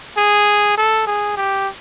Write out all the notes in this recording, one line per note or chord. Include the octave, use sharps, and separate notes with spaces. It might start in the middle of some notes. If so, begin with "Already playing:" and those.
G#4
A4
G#4
G4